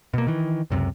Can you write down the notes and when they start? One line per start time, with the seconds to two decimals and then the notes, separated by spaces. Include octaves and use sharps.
0.14 B2 A#3
0.27 D#3 E3
0.70 C#2 F#2 C3